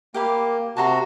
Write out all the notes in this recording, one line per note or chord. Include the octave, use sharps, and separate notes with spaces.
A#3 G4 F5 B5
C3 F#4 A5 A#5 C6